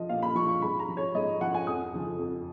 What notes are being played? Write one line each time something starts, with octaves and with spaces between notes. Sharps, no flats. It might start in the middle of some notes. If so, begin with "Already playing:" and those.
Already playing: F3 D#5
A#2 F5
B5
F3 C#6
C#6
G#2 B5
A#5
F3
C#5
G#2 D#5
F3 F#5
G#5
F2 D#6
C#3 F3
F2